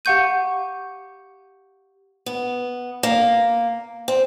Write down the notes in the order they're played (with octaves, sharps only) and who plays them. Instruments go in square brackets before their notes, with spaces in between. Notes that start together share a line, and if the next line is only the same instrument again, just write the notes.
[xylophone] G4 F5 F#5 C#6 G6 D#7
[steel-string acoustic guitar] B3
A#3
C4